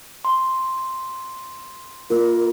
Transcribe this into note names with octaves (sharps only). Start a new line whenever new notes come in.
C6
A#3 F4 A#4